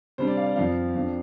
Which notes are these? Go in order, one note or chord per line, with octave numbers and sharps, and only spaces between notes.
C3 G3 D4 C5
D5
F5
D5
F2 F3 C4 F5
F2 F3 D4